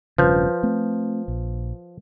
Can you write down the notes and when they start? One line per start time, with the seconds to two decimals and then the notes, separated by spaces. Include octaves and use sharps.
0.18 E1 G2 C#3 F3 B4 G6
0.63 A3 C4
1.28 A#1